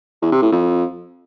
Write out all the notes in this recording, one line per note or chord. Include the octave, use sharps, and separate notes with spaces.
E2
C3
A2
F2